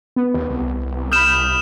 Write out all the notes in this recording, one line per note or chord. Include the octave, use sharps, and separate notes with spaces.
B3
D#2
C2
B5 D#6 F6 G6 E7